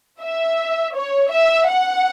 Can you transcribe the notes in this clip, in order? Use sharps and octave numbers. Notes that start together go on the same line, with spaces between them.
E5
C#5
E5
F#5